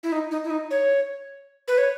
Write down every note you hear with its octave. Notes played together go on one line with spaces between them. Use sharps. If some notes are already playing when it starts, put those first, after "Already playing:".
E4
D#4
D#4
E4
D#4
C#5
B4
C#5